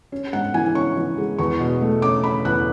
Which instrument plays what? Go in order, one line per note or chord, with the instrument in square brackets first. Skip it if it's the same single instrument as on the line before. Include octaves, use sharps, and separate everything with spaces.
[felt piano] C#4
G#2 F#5
E3 G#5
C#4 C#6
E3
G#3
E2 C#6
B2
A3
C#4 D6
C#4 B5
E2 F#6